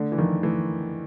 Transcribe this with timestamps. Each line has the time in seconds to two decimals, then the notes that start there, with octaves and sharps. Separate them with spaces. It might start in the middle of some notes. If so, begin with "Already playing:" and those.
Already playing: D3 A3
0.12 E3
0.18 D#3 F3
0.43 E3 A3